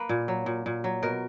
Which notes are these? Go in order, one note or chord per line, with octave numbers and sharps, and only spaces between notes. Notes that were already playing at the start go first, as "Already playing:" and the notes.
Already playing: A#3 B4
A#2
F#3
A#2
A#2
F#3
B2 A#4